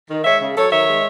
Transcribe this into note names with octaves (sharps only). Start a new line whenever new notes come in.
D#3
G#3 C#5 E5
C#3
F#3 A4 C#5
D#3 C#5 E5
G#3